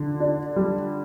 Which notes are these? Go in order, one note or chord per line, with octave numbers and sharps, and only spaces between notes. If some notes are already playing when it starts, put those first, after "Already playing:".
Already playing: D3
D4
G3